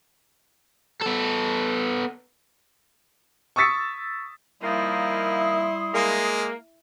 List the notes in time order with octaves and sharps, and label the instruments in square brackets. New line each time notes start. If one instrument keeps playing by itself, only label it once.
[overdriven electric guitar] B3 A4
[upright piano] C#6 D#6 E6 A6 B6 C#7
[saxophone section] D#3 F3 A#3 [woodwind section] G3 C6 D#6 [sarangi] E4
[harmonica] G#3 [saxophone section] A#3